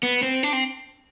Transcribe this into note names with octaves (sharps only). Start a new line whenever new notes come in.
B3
C4
D4
C4